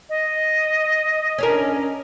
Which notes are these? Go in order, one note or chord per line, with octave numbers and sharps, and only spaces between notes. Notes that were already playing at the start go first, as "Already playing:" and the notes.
D#5
C#4 D4 A#4